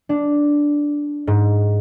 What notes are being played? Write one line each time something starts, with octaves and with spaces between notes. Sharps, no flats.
D4
G#2